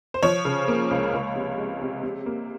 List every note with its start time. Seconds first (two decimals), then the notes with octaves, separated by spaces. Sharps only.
0.14 C5
0.23 F3 C#5
0.45 C#3
0.68 A#3
0.91 C#2
1.13 C#2
1.36 C3
1.58 G#3
1.81 C3
2.03 C3
2.26 A#3